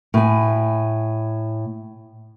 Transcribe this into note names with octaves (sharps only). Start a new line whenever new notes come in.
A2 G#5